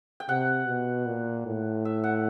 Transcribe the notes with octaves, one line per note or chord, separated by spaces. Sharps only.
G5
C3 F#5
B2
A#2
A2
E5
F#5